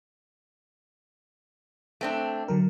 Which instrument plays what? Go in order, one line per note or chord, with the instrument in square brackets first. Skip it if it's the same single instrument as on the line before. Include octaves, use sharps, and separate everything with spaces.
[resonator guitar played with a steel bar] A3 C4 D4
[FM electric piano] D3 F#3 A#4